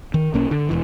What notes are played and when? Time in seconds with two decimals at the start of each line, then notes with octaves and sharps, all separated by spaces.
0.14 D#3
0.34 B1 A#3 C#4
0.51 D3
0.69 E1 A#1 E3